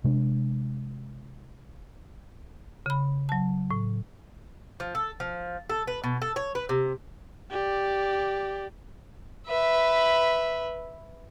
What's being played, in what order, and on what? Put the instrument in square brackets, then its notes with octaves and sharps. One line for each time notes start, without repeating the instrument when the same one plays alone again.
[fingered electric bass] C3 G#3 D4
[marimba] C#3 B5
F#3 A5
A2
[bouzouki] F3
A4
F3
A4
B4
B2
A4
C#5
B4
C3
[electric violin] G4 D5
[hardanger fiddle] B4 E5